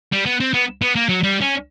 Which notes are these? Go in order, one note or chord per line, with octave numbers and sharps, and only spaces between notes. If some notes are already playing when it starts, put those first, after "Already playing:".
G3
B3
C4
B3
B3
A#3
F#3
G3
C#4